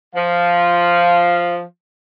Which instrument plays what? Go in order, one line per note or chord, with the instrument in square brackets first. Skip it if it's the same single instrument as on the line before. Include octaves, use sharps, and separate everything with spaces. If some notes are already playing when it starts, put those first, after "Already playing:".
[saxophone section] F3 [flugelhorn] F5